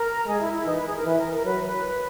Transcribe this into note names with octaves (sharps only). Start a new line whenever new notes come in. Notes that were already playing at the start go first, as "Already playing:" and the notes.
Already playing: A#4 A#5
G#3 G#4 G#5
E4 E5
E4 E5
E3 D#4 D#5
B4
G#4
A#4
E3 B4
A#4
A#4
F#3 B4
B4